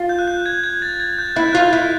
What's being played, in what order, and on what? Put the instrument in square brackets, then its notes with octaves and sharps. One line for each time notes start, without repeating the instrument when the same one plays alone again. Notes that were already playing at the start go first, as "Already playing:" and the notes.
Already playing: [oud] F4
[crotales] G6
F#6
G6
G#6
G#6
A6
G#6
G6
[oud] E4 [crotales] F#6
[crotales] G6
[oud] F4 [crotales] F#6
[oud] E4 [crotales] F#6